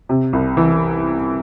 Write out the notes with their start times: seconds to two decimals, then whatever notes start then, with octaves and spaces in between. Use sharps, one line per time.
0.09 C3
0.33 C2
0.57 E3